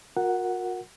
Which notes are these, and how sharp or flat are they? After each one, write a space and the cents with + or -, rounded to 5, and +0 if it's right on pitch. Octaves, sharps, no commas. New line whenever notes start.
F#4 -45 A#4 +0 F#5 +0